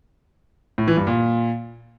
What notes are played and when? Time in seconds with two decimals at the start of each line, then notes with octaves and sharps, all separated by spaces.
0.78 A2
0.88 E3
0.97 G2
1.07 A#2